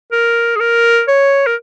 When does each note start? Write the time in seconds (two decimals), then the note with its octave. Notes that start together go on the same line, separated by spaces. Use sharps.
0.12 A#4
0.56 G#4
0.60 A#4
1.08 C#5
1.47 A#4